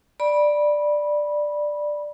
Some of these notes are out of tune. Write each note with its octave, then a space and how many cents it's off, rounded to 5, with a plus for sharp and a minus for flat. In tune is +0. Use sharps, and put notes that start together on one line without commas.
D5 +5 B5 -15